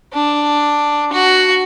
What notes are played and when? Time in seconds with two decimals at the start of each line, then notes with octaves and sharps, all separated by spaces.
0.13 D4
1.13 F#4